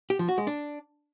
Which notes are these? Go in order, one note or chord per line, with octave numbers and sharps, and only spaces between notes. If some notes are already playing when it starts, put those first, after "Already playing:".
G4
F3
F#4
G#3
D4